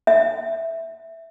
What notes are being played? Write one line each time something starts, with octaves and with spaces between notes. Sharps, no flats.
E5